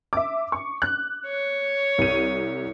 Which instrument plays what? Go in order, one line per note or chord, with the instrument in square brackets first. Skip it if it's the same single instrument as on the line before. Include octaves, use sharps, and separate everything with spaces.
[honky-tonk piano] E5 D6
C#6
F#6
[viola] C#5
[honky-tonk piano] C2 D#7